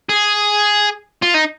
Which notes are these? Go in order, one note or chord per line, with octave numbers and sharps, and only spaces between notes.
G#4
F4
D#4